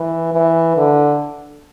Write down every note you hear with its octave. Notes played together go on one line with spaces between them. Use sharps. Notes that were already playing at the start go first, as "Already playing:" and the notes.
Already playing: E3
E3
D3